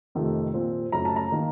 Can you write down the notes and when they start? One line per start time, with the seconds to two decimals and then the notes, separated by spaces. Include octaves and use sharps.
0.15 F2 C3 D#3 A3
0.54 A#2 F3 C4
0.92 F#2 C#3 A3 A#5
1.05 A5
1.16 A#5
1.32 D#3 A#3 D#4